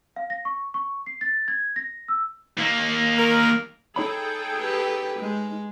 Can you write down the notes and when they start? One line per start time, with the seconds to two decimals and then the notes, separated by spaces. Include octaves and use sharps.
0.16 F5
0.30 A#6
0.45 C#6
0.74 C#6
1.06 C7
1.21 A6
1.48 G#6
1.76 A#6
2.08 E6
2.57 D#2 A#3
3.18 A#4
3.96 D#4 G#4 A4 C#5 G5 B5
4.59 G4 B4
5.20 G#3